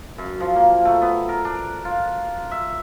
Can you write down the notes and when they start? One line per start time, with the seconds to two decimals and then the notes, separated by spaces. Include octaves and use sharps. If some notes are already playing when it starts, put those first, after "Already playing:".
0.18 F#2
0.40 F3
0.56 A#3
0.85 A3
1.02 B3
1.29 A#4
1.45 D4
1.85 F4
2.51 E5